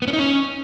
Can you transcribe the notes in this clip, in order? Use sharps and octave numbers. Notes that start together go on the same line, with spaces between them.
B3
C#4
D#4
C#4